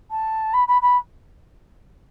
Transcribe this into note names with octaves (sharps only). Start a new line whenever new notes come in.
A5
B5
B5
B5